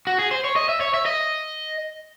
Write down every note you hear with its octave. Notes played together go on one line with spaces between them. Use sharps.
F#4
G#4
C5
C#5
D#5
E5
C#5
E5
D#5